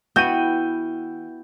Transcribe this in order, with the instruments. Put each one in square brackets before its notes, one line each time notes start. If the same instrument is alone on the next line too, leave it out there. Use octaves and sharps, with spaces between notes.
[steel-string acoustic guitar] E3 [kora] B3 F#4 [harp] E4 G5 [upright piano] G6 D#7